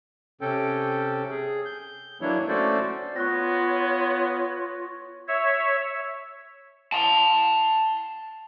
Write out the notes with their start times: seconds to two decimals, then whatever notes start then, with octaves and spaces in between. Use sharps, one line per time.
0.41 C3 C#4 A4 G5
1.30 G#4
1.65 G6
2.21 E3 F#3 A#3 D4 E4 C#5
2.48 A3 C#4 F#4 A4 C5 D5
3.16 B3 F4 C#5 C#6 F#6 A#6
5.28 C#5 E5
6.92 A5 C6